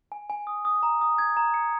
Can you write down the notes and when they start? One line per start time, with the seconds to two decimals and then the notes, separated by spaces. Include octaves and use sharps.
0.12 G#5
0.30 G#5
0.47 D#6
0.65 D#6
0.83 A#5
1.01 D#6
1.18 G#6
1.37 A#5
1.54 C#7